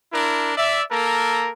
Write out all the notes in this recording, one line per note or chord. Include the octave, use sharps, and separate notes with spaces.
D4 E4 A#4
D5 E5
A#3 A4 A#4